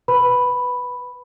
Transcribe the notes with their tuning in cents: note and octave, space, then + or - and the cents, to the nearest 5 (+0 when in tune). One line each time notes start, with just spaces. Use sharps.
B4 +0 B5 +0